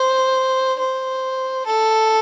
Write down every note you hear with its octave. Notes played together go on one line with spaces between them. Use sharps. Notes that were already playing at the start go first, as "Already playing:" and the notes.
Already playing: C5
C5
A4